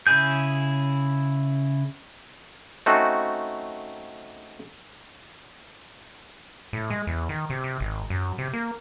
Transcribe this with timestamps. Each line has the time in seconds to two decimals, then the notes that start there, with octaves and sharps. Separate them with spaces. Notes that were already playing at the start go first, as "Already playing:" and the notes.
0.07 C#3 E4 G#4 G6
2.86 A3 C4 C#4 D#4 F#4
6.73 A2
6.90 G#3
7.07 E2
7.29 D#3
7.50 C3
7.64 C3
7.80 G#1
8.10 F#2
8.38 C3
8.53 A#3